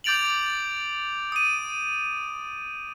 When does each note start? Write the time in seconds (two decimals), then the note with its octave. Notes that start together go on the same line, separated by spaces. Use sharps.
0.04 D6 G6 A6 D7 F7 F#7
1.32 D#6 D#7